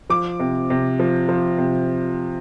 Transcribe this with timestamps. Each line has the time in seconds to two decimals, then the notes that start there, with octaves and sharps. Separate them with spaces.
0.10 F3 D6
0.40 C3
0.70 C3
0.99 F3
1.29 F3
1.58 C3